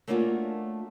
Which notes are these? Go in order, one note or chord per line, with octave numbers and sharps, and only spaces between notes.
A3 A#3 C#4 D4 F4 F#4